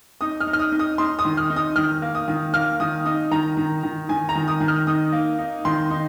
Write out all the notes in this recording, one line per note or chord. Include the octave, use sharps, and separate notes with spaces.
D#4 D#6
F6
D#4
F6
D#6
D#4
D#6
D#4 C6
D#6
D#3
F6
D#4
D#6
D#3 F6
A#3
D#6
D#3
A#3 F6
D#3 D#6
D#4 D#6
D#3 A#5
D#3
D#3
D#3 G#5
A#5
D#3
D#6
D#3
F6
D#4 D#6
A#3
D#4
D#3 C6
D#4